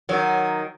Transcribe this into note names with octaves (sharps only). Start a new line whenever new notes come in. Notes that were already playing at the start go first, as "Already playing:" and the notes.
D#3 F#3